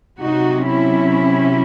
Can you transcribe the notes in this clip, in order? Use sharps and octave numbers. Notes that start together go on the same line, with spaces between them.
C3 F#3 D#4 F#4
C#4 E4